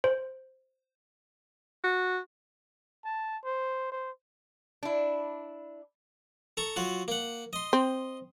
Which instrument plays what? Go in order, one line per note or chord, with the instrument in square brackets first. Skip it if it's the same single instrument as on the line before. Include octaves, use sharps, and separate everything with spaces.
[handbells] C5
[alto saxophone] F#4
[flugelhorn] A5
C5
C5
[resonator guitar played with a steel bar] D4 E4
[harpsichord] A4 A#5 C#6
F#3 F4 F#4
A#3 F#5
D#5 C6
[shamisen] C4